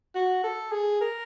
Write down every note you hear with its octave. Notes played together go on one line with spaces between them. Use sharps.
F#4
A4
G#4
A#4